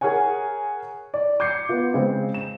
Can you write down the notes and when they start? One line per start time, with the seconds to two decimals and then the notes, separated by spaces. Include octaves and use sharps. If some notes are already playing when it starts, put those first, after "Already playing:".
0.01 G#4 A#4 C#5 F#5 G#5
1.14 D5
1.40 D6 G6 G#6 C7 C#7
1.69 B3 F4
1.94 C#3 G#3 C4
2.34 E7